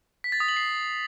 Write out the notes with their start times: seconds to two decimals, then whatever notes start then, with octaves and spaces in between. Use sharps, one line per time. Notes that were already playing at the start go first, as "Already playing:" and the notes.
0.24 B6
0.32 A6
0.40 D#6
0.48 F#7
0.57 C7